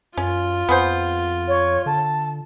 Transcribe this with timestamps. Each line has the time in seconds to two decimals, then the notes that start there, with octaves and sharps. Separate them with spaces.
0.17 F#2 C#4 F4
0.69 F2 B3 G#4 C5
1.48 C#5
1.86 D3 A5